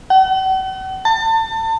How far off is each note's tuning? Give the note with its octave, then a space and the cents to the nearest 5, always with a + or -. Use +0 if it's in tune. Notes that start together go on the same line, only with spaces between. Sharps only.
F#5 +45
A5 +30